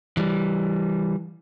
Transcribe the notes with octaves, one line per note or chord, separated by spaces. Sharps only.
E3 G3